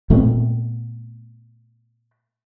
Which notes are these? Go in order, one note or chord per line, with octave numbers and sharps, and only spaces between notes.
A#2 A3 B3 C4